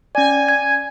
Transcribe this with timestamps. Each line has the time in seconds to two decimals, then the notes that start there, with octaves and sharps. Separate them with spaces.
0.15 C#4 D5 G#5
0.49 G#6